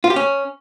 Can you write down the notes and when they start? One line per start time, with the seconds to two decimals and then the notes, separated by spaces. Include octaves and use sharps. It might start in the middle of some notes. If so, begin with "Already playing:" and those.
0.04 F4
0.10 G4
0.16 C#4